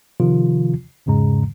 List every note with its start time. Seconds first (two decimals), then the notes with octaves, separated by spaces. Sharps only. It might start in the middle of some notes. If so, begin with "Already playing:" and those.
0.20 C3 D#3 F3 F4
1.06 E2 G#2 C#3 G#3 A#5